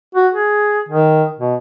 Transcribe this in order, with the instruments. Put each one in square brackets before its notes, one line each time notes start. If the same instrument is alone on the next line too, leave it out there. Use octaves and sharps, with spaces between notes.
[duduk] F#4
G#4
D#3
B2